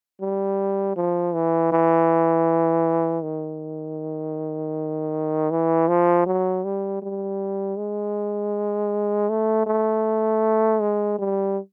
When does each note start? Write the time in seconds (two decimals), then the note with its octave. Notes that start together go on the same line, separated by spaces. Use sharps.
0.21 G3
0.96 F3
1.34 E3
1.72 E3
3.23 D#3
5.51 E3
5.88 F3
6.26 F#3
6.64 G3
7.02 G3
7.78 G#3
9.29 A3
9.67 A3
10.81 G#3
11.19 G3